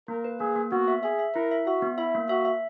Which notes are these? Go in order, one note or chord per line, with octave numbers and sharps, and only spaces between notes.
A#3 A#4
B4
A#3 G#4
A#3
B3 F#4
E5
G#4 E5
E5
E4 A#4
E5
F#4 E5
B3
E4 E5
A#3
F#4 E5
E5